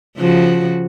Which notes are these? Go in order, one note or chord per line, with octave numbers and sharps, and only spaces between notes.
C#3 F3 F#4